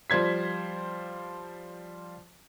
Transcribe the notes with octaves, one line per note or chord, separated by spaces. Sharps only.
F3 G3 C5 G#6 B6